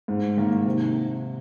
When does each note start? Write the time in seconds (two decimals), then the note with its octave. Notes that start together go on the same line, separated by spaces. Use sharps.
0.08 G#2
0.37 D#3 A#3
0.65 C3